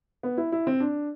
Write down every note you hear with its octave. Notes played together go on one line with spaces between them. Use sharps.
B3
E4
E4
C4
D4